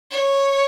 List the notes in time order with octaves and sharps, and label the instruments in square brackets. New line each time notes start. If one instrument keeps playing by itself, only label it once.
[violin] C#5